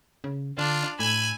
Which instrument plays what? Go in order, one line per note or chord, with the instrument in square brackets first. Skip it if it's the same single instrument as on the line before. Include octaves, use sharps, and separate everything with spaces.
[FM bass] C#3
[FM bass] D3 [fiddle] D4 [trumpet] F4
[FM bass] A2 [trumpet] G#5 [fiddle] B5 E6